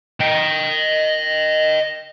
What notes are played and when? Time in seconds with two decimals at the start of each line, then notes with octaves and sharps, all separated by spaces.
0.21 D#5 G5